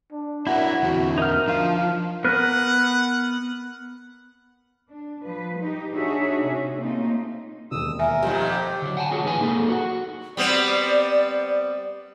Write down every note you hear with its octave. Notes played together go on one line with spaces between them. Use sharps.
D4
D4 E4 F#4 A#4 F#5
E2 D3 C4 F#4
D#4 A#4 F6
F3 D4 F4 F5
B3 A#4 B4 F#5
D4
F3 B4
D#4 G4
D4 D#4 F#4 G#4 C#5 E5
C3 C#4
A3 A#3 C4 C#4 D#4 F4
E1 D#2 D#6 E6
A#4 E5 G#5
F2 A#2 D#3 G3
G4
D3 F#3
F#5 G#5 A5
F4 F#4 G#4 C#5
A2 E3 D#4 B4 G#5
A#3 D#4 G#4 A4
F#4 F#5
G3 B3 C4 D5